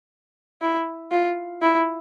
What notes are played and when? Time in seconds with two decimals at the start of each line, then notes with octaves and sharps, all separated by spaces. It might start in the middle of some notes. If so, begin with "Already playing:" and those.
0.61 E4
1.12 F4
1.62 E4